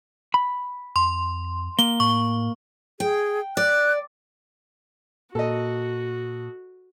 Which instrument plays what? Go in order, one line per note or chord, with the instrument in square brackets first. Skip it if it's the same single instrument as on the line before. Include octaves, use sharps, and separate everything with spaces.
[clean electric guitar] B5
[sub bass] F2 [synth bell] C6
[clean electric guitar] A#3 [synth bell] G7
[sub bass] A2 [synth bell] C#6
[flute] G#4 [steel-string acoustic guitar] G5
[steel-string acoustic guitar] D5 [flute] F#6
[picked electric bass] A#2 [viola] F#4 [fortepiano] A4 D#5